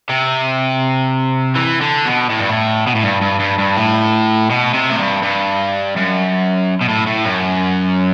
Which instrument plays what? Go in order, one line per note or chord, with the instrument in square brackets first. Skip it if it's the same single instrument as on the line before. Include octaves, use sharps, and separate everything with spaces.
[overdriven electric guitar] C3
E3
D3
B2
A2
G2
A2
B2
A2
G2
G2
G2
G2
A2
B2
C3
A2
G2
G2
F#2
B2
A2
A2
F#2